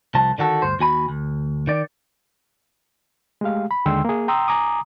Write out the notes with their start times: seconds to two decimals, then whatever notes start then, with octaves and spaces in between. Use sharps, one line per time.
0.15 C2 F3 A5
0.38 D3 D#3 F#4 A4
0.62 D2 G2 C5
0.79 D#2 F#4 G#5 B5
1.09 D2
1.67 D#3 D5
3.41 G#3 A3 G4 F5
3.71 B5
3.86 D#2 D3 G#3 G5 C6 E6
4.05 A#3 G#4
4.28 G5 A#5 C6 D#6 E6
4.48 G#5 A#5 D6 D#6